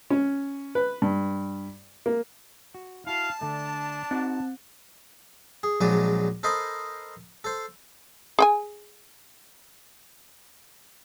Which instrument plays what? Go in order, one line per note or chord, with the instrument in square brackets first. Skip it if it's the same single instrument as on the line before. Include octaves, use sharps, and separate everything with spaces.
[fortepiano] C#4
B4
G2
A#3
[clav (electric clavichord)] F#4
[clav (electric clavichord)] E4 F#4 [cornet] F5 [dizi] A5
[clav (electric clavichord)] D3 A3 [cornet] D4
[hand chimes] C4 [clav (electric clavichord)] D#4 F#4 F#5
[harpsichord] G#4
A#1 A#2 F#3 G#3 D5 G#5
A4 A#4 C5 D#5 B5
A4 C5
[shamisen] G#4 G5 G#5